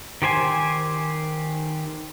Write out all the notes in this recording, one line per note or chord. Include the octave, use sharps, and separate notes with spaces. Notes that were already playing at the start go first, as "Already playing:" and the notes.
D#3 G4 C5 G#5